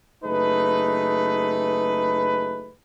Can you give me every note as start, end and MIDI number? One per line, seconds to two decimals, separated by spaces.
0.24 2.73 30
0.24 2.73 57
0.24 2.73 63
0.24 2.73 68
0.24 2.73 71